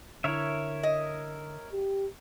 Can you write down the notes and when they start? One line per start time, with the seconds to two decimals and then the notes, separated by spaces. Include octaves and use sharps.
0.24 D3 E4 A#4 C#5 E5
0.83 D#5
1.73 G4